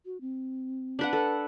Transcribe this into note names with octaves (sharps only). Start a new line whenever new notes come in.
F#4
C4
D4 B4 F#5
A4 B4